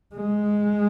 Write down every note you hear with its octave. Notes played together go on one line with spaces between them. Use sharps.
G#3